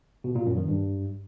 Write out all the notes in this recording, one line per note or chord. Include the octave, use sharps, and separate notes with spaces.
B2
A#2
F#2
D#3
G2